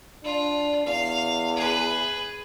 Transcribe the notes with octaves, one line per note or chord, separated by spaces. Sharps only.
D4 F4
E2 F5
G#4 B4